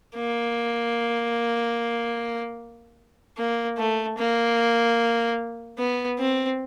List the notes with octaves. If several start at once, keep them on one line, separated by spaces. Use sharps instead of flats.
A#3
A#3
A3
A#3
B3
C4